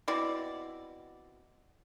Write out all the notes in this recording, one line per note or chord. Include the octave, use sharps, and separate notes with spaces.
B2 C4 E4 D5